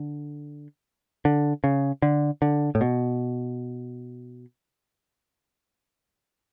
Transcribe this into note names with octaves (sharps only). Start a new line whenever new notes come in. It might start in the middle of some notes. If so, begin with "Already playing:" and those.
Already playing: D3
D3
C#3
D3
D3
A2
B2